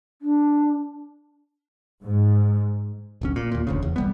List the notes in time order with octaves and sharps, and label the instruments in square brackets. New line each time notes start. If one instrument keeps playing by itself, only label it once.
[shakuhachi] D4
[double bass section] G#2
[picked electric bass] D1 B1 C#4
A#2
D#2 A#2
F1 D2 C#3
E2
B1 G3 B3